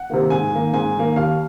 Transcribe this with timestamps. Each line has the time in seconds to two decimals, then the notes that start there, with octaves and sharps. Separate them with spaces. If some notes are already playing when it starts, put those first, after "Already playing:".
Already playing: F#5
0.10 C3 D#3 A#3
0.30 G#2 G#5
0.52 D#3 A#3
0.73 G#2 G#5
0.94 D#3 A#3
1.16 D#2 F5